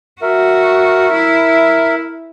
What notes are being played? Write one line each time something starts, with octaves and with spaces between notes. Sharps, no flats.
F#4 A#4 E5
E4